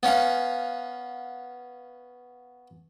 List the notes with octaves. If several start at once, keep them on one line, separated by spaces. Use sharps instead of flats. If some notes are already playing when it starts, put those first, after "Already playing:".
B3 C#4 F5